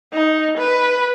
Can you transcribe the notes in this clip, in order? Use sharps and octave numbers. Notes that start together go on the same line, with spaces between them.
D#4
B4